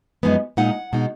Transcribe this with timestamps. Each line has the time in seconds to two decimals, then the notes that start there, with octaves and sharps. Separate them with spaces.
0.23 F#2 F3 G#3 B3 D#4
0.57 A#2 G#3 D#4 F#5
0.93 B2 G#3 D#4